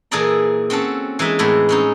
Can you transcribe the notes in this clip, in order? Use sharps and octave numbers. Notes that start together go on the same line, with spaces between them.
A#2 E3 G#4 A4 D5 A#5
C4 C#4 F#4 A4
E3 G#3 D#4 E5
E2 A2 G#3 E5
C4 C#4 D#4